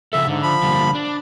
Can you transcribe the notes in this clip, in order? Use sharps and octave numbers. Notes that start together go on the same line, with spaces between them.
C#3 F3 A4 E5
G#2 D3
F3 B5
D3 G3 A#3
D4